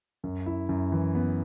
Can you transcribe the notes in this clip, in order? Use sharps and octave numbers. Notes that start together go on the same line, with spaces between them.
F#2
E4
F#2
E3
B3